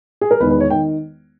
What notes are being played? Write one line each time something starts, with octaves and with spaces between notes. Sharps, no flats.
G#4
A#4
E1 E2 D#3 B4
B4
C#5
D#3 G5